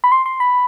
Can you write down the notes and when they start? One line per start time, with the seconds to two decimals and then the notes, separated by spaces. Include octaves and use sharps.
0.04 B5
0.12 C6
0.26 C6
0.40 B5